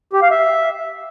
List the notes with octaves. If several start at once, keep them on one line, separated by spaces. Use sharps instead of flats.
G4
F5
E5